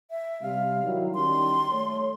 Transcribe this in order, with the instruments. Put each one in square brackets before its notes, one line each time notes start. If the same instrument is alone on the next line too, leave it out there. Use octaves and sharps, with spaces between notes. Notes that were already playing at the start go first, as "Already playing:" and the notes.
[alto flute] E5
[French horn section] C3 G3 [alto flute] F5
[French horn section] D#3 F#3 E4
[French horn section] D#3 G3 C#4 [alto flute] C6
[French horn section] A3 C#5